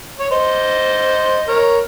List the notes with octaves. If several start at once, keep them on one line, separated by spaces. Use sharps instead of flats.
C#5
C5 D#5
A#4 C#5